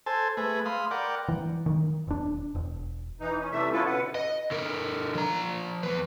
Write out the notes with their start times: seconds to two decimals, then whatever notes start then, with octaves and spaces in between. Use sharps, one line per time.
0.06 A4 C5 G#5 A5
0.37 A3 G#4 B4
0.66 F5 B5 C6 D#6
0.91 A#4 D5 F#5 G5
1.28 E3
1.66 D#3
2.07 E1 D4
2.55 E1
3.20 E3 D#4
3.39 C#4
3.52 C3 E3 G3 A3 E5
3.72 B3 C#4 E4 F4 A4 B4
3.86 B2 D3 B4 F#5
4.15 D#5
4.51 D3 A#4
5.15 F3 A#5
5.83 E2 B4